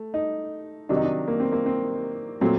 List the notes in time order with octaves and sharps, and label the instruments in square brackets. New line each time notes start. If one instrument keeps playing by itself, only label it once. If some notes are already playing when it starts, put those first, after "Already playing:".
Already playing: [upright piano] A3
D#4
C3 D#3 F#3 D4
D#4
D4
A#3
C4
A#3
C4
A#2 F#3 A3 C4